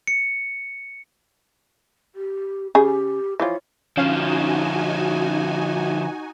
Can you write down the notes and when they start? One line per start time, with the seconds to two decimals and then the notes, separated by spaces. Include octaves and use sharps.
0.07 C#7
2.15 G4
2.75 C#3 G4 G#4
3.40 E3 F3 F4 C#5
3.97 D3 F3 C#4 D#4 F#4 F5 G#5